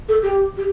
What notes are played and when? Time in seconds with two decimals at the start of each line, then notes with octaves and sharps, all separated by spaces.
0.08 A4
0.22 G4
0.57 G4